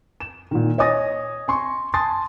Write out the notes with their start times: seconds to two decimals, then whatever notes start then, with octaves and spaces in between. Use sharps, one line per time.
0.20 E7
0.51 A#2 D#3
0.78 C#5 D#5 G#5 D#6 A6 A#6
1.48 G#5 C6 C#6
1.94 G#5 A5 C6 D#6 A6